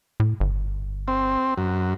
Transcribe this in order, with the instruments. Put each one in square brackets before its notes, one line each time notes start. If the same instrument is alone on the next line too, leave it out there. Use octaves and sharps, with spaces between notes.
[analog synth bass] A2
G1
[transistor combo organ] C4
F#2